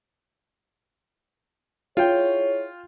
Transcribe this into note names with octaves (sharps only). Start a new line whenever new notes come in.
E4 F4 G#4 C#5 G5